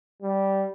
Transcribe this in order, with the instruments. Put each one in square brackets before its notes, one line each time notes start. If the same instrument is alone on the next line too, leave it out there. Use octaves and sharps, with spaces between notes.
[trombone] G3